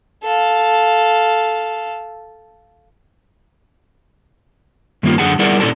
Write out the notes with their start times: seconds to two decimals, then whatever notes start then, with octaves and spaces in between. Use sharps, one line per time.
0.23 A4 F5
5.03 G2 D#3 A#3 C#4 F4
5.18 F#2 D3 G#4 F#5 A5
5.39 G3 E4 G#4 A#4 D5 F#5
5.60 A#2 C#4 E4 A4 D5 A5